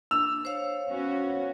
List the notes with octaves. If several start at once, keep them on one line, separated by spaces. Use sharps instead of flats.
D4 E6
C5 C#5 F5
B3 C#4 F#4